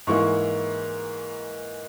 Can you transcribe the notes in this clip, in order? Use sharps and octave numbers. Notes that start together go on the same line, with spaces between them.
G#2 E3 A#3 E4 C#6